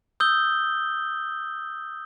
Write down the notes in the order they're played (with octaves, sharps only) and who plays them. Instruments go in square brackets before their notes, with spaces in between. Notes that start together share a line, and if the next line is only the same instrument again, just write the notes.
[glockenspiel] D#6 E6 G6 G7